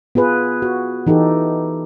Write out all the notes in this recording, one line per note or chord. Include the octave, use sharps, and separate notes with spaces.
B3 F4 G#4 B4
F#4
E3 D#4 G4 A4